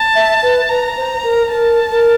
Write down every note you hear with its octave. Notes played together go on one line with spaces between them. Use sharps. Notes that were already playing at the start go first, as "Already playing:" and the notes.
Already playing: A5
E5
B4
B4 A#5
C5
A#4
A#4 A5
A#4